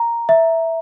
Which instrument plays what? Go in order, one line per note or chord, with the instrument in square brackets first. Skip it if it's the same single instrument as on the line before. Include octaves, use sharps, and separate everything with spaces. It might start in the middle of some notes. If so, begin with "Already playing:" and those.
Already playing: [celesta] A#5
E5